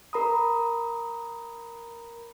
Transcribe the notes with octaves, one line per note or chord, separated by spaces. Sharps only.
A#4 A#5 B5 D#6